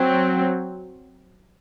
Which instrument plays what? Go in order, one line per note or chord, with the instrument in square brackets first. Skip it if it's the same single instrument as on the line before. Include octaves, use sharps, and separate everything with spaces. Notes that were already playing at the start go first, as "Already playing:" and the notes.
Already playing: [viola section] F#3 C4